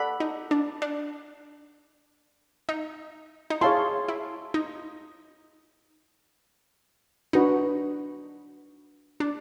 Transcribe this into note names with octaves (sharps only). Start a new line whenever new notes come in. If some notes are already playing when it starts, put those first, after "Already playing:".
Already playing: A4 D5 F#5 B5
D#4
D4
D4
D#4
D#4
E4 G#4 C#5 F5 A5 C6
E4
D#4
D4 D#4 F#4 B4
D4